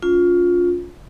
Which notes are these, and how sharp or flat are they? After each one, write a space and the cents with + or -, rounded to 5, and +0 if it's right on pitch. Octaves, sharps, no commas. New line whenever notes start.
C#4 +35 F4 +15